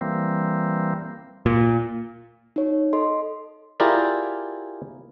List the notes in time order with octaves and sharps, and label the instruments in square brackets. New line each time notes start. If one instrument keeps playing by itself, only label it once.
[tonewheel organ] E3 G3 A#3 C4
[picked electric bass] A#2
[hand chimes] D#4 C#5
A4 D#5 C6
[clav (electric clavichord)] E4 F4 G4 G#4 A#4 D5